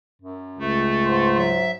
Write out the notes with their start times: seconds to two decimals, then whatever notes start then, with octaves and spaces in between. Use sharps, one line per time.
0.22 F#2
0.59 C#2 A3
1.05 G#2 C6
1.38 F#3 E5